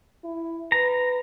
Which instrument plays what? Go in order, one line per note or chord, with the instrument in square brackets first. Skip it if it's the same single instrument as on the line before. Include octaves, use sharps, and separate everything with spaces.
[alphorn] E4
[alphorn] B4 [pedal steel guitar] A#5